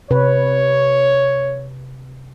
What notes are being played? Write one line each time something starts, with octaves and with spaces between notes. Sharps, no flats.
C3 B4 C#5